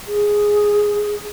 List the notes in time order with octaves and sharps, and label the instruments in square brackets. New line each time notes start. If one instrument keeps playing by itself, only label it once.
[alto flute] G#4